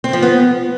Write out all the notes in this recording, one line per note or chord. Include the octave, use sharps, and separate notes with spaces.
C4
F3
B3